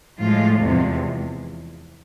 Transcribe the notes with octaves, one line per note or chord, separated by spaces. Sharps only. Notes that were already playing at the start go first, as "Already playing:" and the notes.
A2 F3 G#3 F4
E2 C3 F3 G#3